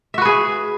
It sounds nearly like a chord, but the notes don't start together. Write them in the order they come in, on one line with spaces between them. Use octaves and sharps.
E5 F#4 B4 G#4